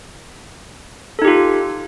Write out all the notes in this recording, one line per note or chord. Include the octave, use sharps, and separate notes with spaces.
D#4 F4 G4 A4